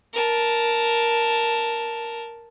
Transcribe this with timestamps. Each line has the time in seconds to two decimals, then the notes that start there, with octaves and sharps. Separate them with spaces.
0.13 A#4 A5